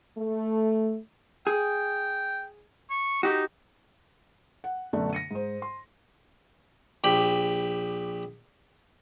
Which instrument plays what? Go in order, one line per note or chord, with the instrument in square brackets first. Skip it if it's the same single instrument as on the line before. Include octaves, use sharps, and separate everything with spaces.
[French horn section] A3
[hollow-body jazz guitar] G#4 [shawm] G5
[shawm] C#6
[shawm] D#4 [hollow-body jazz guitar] F#4 G4
[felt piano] F#5
F#2 B2 D3 A3 D4
A#6 C#7 D#7
G#2 C5
C6
[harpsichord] A#1 G4 B5